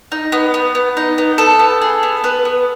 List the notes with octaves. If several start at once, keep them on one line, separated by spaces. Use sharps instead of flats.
D#4
B3
B3
B3
D#4
B3
B3 A4
B3
G#4
B3
B3 B4
B3